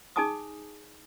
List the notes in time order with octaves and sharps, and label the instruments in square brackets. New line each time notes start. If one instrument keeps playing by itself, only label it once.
[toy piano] D#4 G#4 G#5 A5 D6 D#6